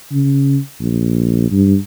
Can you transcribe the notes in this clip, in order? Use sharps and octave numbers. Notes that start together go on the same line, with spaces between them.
C#3
A#1
G2